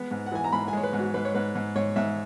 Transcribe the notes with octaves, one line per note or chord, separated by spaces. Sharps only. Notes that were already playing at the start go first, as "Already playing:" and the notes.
Already playing: G#3 B3
G#2
F#5
E3 G#5
A#5
G#2 B5
G#5
G#3 C#5
B4
G#2
F#4
G#2 B4
C#5
G#2 B4
G#2
G#2 C#5
G#2 E5